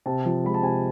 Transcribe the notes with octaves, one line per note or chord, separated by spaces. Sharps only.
C3 A5
F3
G#3 B5
A5
C3 G#5